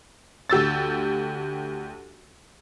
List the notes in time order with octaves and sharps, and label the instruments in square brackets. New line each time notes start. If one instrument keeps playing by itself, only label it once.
[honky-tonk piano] D2 G4 E6 A6